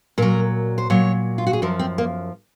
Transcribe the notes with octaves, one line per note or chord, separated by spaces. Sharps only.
A#2 F#3 A#4
C5
A#2 F#3 C#5
F4
F#4
G#4
F#2 F3 A#4
C4
A#3